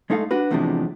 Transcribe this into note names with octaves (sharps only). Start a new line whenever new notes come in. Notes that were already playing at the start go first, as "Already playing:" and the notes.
G#3 A3 D#4 A4 F5
D4 F#4 B4
E2 A2 C3 F3 G#3 D4